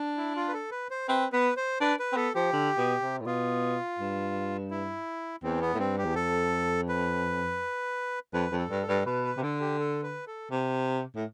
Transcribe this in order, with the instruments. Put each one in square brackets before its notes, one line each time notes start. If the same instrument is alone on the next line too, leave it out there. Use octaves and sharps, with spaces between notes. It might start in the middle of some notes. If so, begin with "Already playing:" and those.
Already playing: [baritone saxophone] D4
[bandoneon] E4
F4
B4
A4
B4
C5
[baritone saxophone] C4 [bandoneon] B4
[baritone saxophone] B3 [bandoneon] B4
[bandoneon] C5
[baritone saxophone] D4 [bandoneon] B4
[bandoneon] B4
[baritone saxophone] C4
[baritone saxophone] B3 [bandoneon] A4
[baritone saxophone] F3 [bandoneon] G4
[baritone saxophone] D3
B2
C3
A2
[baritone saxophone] B2 [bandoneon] F4
[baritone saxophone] G2
[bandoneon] E4
[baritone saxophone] E2 [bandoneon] C4
[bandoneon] B3
[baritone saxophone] A2
[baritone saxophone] G2 [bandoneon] C4
[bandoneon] G4
[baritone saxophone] E2
[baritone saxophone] F2 [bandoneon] A4
[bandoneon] B4
[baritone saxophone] F2 [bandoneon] B4
[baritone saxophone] F2
[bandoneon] A4
[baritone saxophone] G2
[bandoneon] A4
[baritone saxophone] G2
[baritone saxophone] B2 [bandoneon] B4
[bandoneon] B4
[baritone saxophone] C3
[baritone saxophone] D3 [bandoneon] A4
[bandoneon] G4
A4
B4
A4
[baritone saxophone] C3
A2